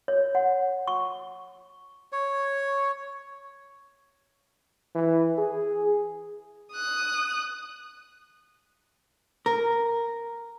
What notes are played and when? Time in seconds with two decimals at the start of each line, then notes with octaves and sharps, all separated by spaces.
0.08 C#5
0.35 F#5
0.88 C#6
2.12 C#5
4.95 E3
5.38 G#4
6.73 D#6 F#6
9.46 A#4